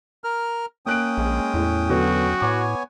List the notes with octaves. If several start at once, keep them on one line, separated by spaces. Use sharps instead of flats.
A#4 F6
A#3 C#4 G5 D#6 F#6 D7
A#1 G#3
E2 A2
D3 F#3 B3 F#4
A2 B3 C#5 G#5 D6